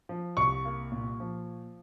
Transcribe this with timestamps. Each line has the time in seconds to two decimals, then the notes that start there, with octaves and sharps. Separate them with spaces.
0.09 F3
0.37 C2 C#6
0.65 A#3
0.92 A#2
1.20 F3